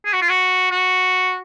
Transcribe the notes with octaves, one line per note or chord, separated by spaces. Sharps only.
G#4
F#4
F4
F#4
F#4